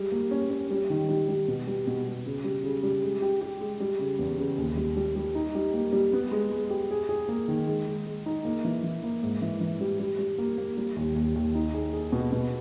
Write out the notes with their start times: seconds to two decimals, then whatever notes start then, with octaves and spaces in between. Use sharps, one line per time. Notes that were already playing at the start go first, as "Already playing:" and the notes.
Already playing: G3 G#3
0.12 A#3
0.31 C#4
0.50 C#4
0.71 G3
0.90 D#3
1.09 G3
1.28 G3
1.48 B2
1.67 G3
1.87 B2
2.06 G3
2.26 C#3
2.44 G3
2.64 C#3
2.83 G3
3.03 G#3
3.22 G4
3.41 G4
3.61 G#3
3.80 G3
3.99 C#3
4.19 E2
4.38 C#3
4.58 D#2
4.77 G3
4.97 G3
5.16 G3
5.35 D#4
5.55 G3
5.74 A#3
5.93 G3
6.13 B3
6.31 G#3
6.51 G#3
6.70 G4
6.91 G#4
7.09 G#4
7.29 A#3
7.48 D#3
7.67 G#3
7.87 G#3
8.06 G#3
8.26 D#4
8.45 A#3
8.65 E3
8.83 E3
9.04 A#3
9.23 G#2
9.42 E3
9.61 E3
9.81 G3
9.99 G3
10.19 G3
10.38 A#3
10.58 A#3
10.77 G3
10.96 D#2
11.16 D#2
11.35 D#2
11.55 D#4
11.74 G#4
11.93 G#4
12.12 B2
12.32 B2